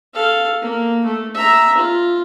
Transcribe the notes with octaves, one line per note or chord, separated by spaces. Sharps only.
A4 F5
A#3
A3
E5 A#5
F4